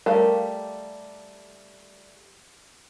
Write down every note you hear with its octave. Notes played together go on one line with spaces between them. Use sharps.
G3 A3 G4 A#4 F5